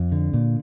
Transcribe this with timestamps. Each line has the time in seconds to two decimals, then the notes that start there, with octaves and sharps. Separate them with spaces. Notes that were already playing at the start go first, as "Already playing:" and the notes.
Already playing: F2
0.12 D3
0.34 A#2